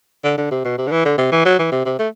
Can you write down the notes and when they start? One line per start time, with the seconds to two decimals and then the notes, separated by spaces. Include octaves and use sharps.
0.24 D3
0.38 D3
0.51 C3
0.64 B2
0.78 C3
0.87 D3
0.91 E3
1.05 D3
1.18 C3
1.31 E3
1.45 F#3
1.59 E3
1.72 C3
1.85 C3
1.99 A3